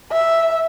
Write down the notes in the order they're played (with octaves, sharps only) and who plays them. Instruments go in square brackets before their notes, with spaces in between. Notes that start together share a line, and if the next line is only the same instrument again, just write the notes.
[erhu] E5